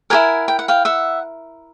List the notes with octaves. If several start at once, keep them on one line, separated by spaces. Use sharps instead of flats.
E4 G4 A#4 F#5 G#5
G5
F#5
F5 G5
E5 F#5